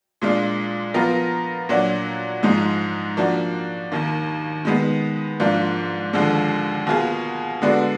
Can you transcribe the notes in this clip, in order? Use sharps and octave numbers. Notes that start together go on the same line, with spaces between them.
A#2 G#3 D4 F4
F3 B3 F4 A#4
A#2 F#3 A#3 D4 F#4
G#2 F3 G#3 D#4
F3 A#3 D4 F#4
D#2 D#3 A#3
D#3 G#3 B3
G#2 F3 A#3 D4 F4
D#2 D3 F3 G#3
B2 A#3 F4 G#4
D3 G#3 B3 D4 F#4